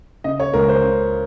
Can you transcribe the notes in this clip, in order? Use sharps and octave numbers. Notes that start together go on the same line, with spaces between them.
C#3 D#5
C#5
C#2 A#4
C5
C#3